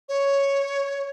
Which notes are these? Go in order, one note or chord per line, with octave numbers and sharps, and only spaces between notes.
C#5